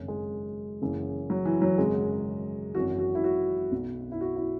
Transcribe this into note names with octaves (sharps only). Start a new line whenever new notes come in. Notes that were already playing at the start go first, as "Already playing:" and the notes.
Already playing: G#1 F#2 C#3
G#3
F#1 F#2 C#3 E3
F#3
E3
F#3
G#1 F#2 C#3 G#3
G#1 F#2 E3 F#4
F#4
E4
F#4
B1 B2
E4
F#4
E4